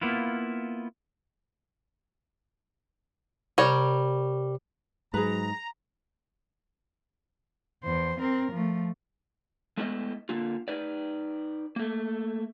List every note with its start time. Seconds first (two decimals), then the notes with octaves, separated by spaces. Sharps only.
0.01 A#3 B3 E4 F4
3.58 C3 G3 A#4 C#5
5.14 G#2 F#3 G#4 B4 A#5
7.84 E2 C5
8.20 C4 A#4
8.53 F3 A3
9.77 G#3 A3 B3 E4 B4 D#5
10.29 D3 A#3 F4
10.68 D#4 B4 D5
11.76 A3 A#3